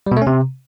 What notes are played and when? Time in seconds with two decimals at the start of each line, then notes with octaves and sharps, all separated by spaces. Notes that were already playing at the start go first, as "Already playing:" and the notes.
0.07 G3
0.12 B2
0.17 A3
0.22 C#4
0.27 C3